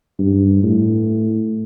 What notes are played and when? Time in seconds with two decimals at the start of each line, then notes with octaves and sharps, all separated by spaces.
0.19 G2
0.63 A2